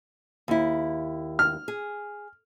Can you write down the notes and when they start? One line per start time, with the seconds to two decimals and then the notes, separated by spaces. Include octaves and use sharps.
0.48 D#2 E4
1.39 F6
1.68 G#4